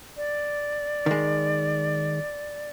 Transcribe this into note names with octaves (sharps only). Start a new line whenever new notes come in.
D5
D#3 G#3